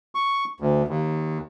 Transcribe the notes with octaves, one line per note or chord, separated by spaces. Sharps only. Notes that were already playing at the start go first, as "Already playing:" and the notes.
C#6
D2
D#2